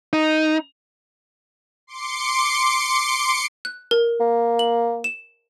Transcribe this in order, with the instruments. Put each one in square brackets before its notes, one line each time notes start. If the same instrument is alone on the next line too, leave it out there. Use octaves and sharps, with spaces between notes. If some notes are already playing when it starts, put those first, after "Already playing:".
[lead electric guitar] D#4
[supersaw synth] C6 D6 C#7
[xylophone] F#6
A#4
[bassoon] A#3
[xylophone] F#7
E7